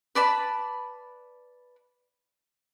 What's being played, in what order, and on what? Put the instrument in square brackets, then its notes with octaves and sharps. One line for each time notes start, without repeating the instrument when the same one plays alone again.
[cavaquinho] B4 D5 A5 B5